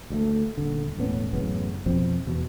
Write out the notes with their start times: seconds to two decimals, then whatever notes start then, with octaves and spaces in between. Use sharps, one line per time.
0.10 D2 G3 A3
0.57 D#1 D3
0.97 E1 A2 B3 C#4
1.33 A1 F#2 C#3 B3
1.86 F2 B2 F3 C4
2.26 E2 B2